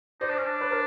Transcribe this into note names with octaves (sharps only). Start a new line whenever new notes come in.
D#4 C5 D5
D4
C#4
D4
B4 C#5
A#4 C5